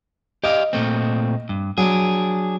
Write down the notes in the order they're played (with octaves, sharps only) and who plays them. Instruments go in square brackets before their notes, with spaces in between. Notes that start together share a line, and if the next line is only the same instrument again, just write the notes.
[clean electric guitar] G4 D5 F5 [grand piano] D#5
[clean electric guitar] A#2 A3 C4
G2
[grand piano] F#3 [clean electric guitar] D4 G#4